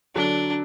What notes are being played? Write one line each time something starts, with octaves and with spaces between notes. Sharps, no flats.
D3 F#3 D4